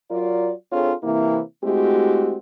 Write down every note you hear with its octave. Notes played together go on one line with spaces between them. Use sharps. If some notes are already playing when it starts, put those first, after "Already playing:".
F#3 F4 A#4 D5
C4 D4 F4 G#4 A4 C#5
C3 E3 A#3 C4 E4
G#3 A3 C4 E4 F#4 G4